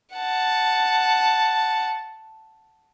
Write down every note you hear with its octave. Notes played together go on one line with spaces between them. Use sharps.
F#5 A5